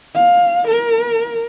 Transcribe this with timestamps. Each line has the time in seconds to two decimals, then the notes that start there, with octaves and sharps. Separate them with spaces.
0.15 F5
0.67 A#4